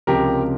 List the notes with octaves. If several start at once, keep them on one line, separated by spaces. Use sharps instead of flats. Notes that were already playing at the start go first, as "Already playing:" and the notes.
C#2 C3 F3 G4 A#4